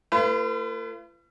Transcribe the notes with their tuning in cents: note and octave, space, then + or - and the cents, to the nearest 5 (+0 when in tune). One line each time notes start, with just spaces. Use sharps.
A#3 -45 F4 -45 B4 +25